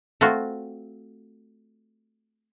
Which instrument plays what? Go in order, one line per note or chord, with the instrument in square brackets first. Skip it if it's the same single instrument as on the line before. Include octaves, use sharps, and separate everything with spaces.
[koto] A3 C4 F4 F#4